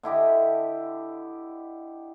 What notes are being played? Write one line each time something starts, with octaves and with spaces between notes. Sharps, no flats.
D3 E4 G4 D#5